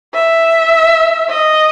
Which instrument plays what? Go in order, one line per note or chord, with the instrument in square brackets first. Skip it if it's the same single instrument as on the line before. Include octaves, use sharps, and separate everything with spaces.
[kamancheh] E5
D#5